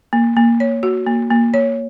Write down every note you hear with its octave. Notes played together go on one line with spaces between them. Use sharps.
A#3
A#3
C#5
F#4
A#3
A#3
C#5